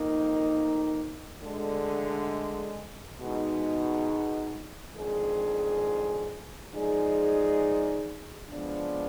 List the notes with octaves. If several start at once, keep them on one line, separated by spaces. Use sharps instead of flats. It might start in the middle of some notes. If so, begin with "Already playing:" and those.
Already playing: F2 D#3 A#3 D#4
D2 D3 G#3
B2 G#3 D#4
F2 D#3 G#3 D4 G#4
F3 G#3 D#4 G#4 D5
F3 G#3 B3 D4